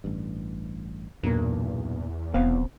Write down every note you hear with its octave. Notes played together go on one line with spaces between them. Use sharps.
A1 G2
B1 E2 G2 A#2 A#3
D#1 B1 B3 C4 F5